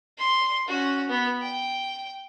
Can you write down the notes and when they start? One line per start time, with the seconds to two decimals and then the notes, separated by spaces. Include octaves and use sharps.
0.18 C6
0.68 C#4 F#4
1.08 B3
1.41 G5